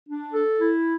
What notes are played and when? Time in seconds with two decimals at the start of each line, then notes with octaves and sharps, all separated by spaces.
0.08 D4
0.33 A4
0.60 E4